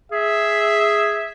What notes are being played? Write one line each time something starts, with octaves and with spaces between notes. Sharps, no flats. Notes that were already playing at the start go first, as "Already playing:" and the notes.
G#4 E5